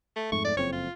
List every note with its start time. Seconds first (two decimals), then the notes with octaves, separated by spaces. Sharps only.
0.16 A3
0.32 F2 G#2 A3 C#6
0.44 D5
0.57 F#1 F2 C4 C#5
0.72 F4